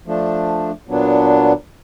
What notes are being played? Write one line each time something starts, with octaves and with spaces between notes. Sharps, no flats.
F3 A3 D4
A#2 F#3 B3 D4